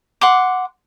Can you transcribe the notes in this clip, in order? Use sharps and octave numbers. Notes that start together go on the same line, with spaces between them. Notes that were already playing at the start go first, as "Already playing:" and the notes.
F#5 C6 D6